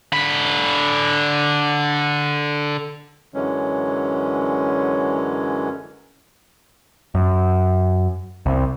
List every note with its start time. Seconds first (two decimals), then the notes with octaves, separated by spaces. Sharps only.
0.13 D3 B5
3.34 F#2 D3 E3 F#3 G#3 C#4
7.15 F#2
8.46 C2